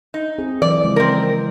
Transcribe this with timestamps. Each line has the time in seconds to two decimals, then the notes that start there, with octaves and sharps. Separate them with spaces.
0.14 D#4
0.38 C4 G#4
0.62 E3 F#3 D5
0.84 C#3 F3 G#3
0.96 C4 A#4